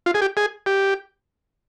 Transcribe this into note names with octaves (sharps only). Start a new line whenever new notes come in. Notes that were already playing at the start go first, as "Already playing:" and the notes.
F4
G#4
G4
G#4
G4